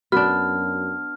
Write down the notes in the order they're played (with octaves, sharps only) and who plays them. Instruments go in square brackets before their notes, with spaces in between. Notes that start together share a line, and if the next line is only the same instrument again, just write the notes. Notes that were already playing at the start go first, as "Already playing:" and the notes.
[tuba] F#2 [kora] B3 D4 [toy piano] F#4 [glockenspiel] F6